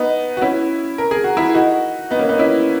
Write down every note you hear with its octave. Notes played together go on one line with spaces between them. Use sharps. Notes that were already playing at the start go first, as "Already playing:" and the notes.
Already playing: B3 D#4
F#4
C#4 E4
A#4
G#4
F#4
E4 G#4
D#4 F#4
B3 D#4
A#3 C#4
B3 D#4
C#4 E4